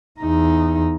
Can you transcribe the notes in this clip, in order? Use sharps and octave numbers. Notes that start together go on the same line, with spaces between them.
E2 D#4